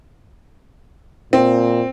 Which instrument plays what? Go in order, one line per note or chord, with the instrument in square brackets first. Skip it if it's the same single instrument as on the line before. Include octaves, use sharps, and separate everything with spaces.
[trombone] A#2 [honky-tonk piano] C4